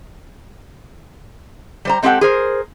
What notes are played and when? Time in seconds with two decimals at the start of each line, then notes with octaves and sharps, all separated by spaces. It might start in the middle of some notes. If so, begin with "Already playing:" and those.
1.85 G3 C5 A#5
2.02 G#3 C4 G4 A4 F#5 G5
2.21 G#4 A#4 C5